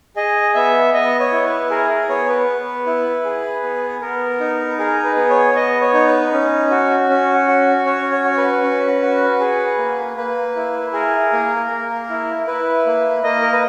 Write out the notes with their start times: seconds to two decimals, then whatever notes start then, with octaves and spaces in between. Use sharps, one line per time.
0.16 G#4 D#5
0.55 B3 E5
0.94 B3 D#5
1.20 C#5
1.32 E4
1.45 B4
1.70 G#4 A#4
1.90 A#4
2.09 B3 C#5
2.29 B4
2.48 B3
2.87 E4
3.24 G#4
3.63 B3
4.02 B3 A#4
4.40 D#4
4.79 G#4 A#4
5.04 B4
5.16 B3
5.30 C#5
5.55 B3 D#5
5.81 C#5
5.94 D#4
6.06 B4
6.33 C#4
6.71 F#4
7.09 C#4
7.48 F#4
7.86 C#4 C#5
8.12 C#5
8.24 F#4
8.31 C#5
8.37 B4
8.63 C#4
9.02 F#4
9.40 G#4
9.78 A#3
10.17 A#3 B4
10.56 E4
10.93 G#4 A#4
11.33 A#3
11.71 A#3
12.10 E4
12.47 E4 B4
12.86 A#3
13.24 A#3 D#5
13.42 A#4
13.52 B4